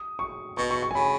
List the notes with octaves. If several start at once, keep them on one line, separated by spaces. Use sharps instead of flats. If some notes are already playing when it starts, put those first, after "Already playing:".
Already playing: D#6
C#6
B2 C#6
C#6
C#6
G#5
C#3 B5